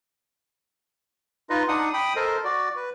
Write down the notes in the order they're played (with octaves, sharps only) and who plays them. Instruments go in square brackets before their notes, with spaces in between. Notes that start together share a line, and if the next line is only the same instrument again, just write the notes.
[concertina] D#4 F4 B4 D#5
D4 D#4 F#5 D#6
G5 B5 D#6
A4 A#4 C5 D#5
F#4 D5
B4